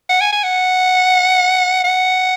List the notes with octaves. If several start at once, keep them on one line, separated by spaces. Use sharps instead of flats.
F#5
G#5
G#5
F#5
F#5